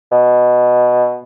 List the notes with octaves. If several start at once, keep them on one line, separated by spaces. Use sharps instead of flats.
B2